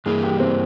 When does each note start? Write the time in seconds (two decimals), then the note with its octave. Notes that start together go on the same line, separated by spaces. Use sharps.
0.06 G2 E3 A#3 G#4
0.23 G4
0.40 C4